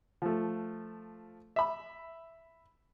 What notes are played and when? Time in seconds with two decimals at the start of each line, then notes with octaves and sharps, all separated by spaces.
0.22 F3 A3
1.56 E5 B5